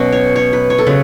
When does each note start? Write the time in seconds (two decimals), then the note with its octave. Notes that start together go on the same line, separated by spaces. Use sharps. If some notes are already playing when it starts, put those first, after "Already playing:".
Already playing: B2 F#3 C#4
0.12 C#5
0.36 C#5
0.53 B4
0.70 C#5
0.78 A4
0.87 C#3 F#3 B4